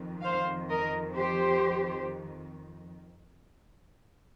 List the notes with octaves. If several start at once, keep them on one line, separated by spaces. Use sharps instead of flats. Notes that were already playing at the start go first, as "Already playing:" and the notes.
Already playing: F2 D#3
C5 F5
A#4 D#5
G4 C5